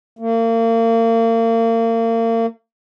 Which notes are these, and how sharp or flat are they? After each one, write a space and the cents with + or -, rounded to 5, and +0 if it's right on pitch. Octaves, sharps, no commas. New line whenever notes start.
A#3 -35